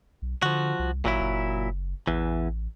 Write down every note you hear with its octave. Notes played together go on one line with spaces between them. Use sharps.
B1
D3 F3 F#4
C2
G#1 A#2 F#3 E4
F#1
A1 E2 E3